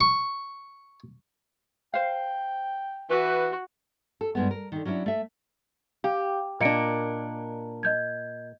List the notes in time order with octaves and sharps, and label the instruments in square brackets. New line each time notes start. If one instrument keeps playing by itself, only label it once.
[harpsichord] C#6
[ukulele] C5 F5 [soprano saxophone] G5
[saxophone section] E3 B4 [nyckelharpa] F#4
[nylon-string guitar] A4
G2 G#3 B3
A#4
D3 D#3
F#3 C#4 D4 E4
A3 E5
[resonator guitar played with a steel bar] G4 [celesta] F5
[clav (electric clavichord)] A#2 [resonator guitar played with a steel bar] A#3 D4 [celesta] D#5 C#7 D7
[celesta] D#5 G6 G#6